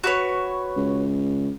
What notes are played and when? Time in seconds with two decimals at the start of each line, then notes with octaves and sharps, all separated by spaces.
0.04 F#4 B4 C#5
0.77 C#2